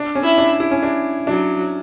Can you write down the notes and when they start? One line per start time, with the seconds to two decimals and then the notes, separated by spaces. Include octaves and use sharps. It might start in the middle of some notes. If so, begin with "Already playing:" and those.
Already playing: D4
0.15 C#4
0.23 E4
0.38 D4
0.60 E4
0.71 C#4
0.83 D4
1.27 F#3 D4